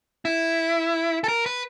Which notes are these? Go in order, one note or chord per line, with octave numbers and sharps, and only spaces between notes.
E4
A4
A#4
B4